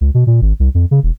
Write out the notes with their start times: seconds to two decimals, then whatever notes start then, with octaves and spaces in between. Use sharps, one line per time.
0.01 C#2
0.14 B2
0.27 A#2
0.42 G#1
0.60 C2
0.75 F2
0.91 C#3
1.03 E1